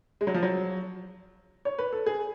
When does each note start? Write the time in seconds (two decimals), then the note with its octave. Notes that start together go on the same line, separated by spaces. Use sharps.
0.21 G#3
0.27 F#3
0.34 F3
0.43 F#3
1.65 C#5
1.79 B4
1.93 A4
2.06 G#4